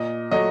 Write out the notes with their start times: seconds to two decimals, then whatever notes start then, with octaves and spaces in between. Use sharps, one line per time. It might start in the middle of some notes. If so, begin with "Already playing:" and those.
Already playing: A#2 D#5
0.31 F#3 A3 D#5